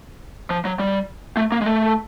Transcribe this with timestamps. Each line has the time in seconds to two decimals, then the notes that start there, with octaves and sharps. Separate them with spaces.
0.50 F3
0.65 F#3
0.79 G3
1.37 A3
1.52 A#3
1.61 G#3
1.66 A3